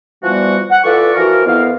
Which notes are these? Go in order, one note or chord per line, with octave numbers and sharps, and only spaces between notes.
E3 F3 G3 B3 F#4
F#5
E3 F4 A4 B4 D5 C#6
E3 F3 F#4 A#4
F2 E3 B3 F5